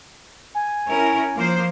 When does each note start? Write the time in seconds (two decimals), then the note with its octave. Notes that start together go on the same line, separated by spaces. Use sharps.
0.55 G#5
0.87 C#4 E4 A#4
1.35 F3 A#3 C5